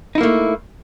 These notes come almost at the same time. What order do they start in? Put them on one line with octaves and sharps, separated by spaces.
D#4 E4 A#3 A3